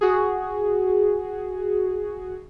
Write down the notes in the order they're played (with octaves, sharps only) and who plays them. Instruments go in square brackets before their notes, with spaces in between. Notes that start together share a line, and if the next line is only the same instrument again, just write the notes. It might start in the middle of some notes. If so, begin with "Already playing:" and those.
[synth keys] F#4 G#4